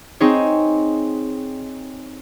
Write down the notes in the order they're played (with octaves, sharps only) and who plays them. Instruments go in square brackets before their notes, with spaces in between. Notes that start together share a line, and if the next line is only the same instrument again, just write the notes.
[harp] C4 D#4 G#4 C#5